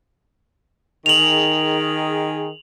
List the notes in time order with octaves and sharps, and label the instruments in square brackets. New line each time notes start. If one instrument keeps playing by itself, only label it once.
[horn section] D#3 G#4 [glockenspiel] F7 F#7